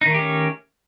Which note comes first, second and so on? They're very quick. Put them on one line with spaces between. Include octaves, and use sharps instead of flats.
D#4 D#3 A3 G4 C#4